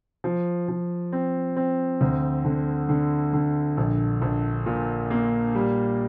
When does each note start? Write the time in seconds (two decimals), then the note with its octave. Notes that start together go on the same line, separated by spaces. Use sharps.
0.24 F3
0.69 F3
1.12 C4
1.56 C4
2.01 D2
2.45 D3
2.89 D3
3.33 D3
3.77 A#1
4.21 A#1
4.66 A#2
5.11 A#3
5.55 G3